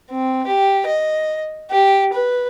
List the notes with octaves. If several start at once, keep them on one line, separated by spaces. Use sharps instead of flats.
C4
G4
D#5
G4
B4